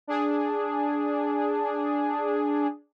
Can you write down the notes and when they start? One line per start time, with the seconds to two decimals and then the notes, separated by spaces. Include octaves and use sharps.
0.07 D4 G#4